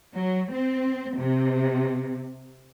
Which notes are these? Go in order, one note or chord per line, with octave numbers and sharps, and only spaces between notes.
F#3
C4
C3